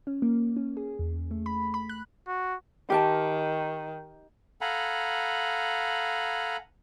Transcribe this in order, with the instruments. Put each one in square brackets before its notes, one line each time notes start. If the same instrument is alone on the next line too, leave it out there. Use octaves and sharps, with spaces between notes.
[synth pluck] C#4
A#3
C#4
G#4
E2
A3
B5
B5
F#6
[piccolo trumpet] F#4
[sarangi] D#3 [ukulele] G4 A#4 A5
[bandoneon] A4 F5 F#5 G#5 A#5 B5